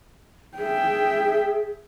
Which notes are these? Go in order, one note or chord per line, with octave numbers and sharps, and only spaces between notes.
G#4 E5 G5